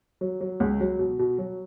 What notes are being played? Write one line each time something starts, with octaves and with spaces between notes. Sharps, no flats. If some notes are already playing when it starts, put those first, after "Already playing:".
F#3
F#3
C#2
F#3
B2
B2
F#3